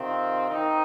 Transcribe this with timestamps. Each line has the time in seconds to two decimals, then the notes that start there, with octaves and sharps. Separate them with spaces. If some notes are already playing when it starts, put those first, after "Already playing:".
Already playing: C3 D#3 C4 F4
0.49 D#3 C4 D#4